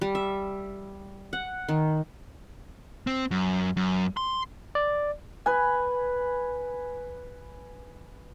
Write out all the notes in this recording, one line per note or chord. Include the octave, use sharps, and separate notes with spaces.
G3
E5
F#5
D#3
C4
F#2
F#2
C6
D5
B4 G#5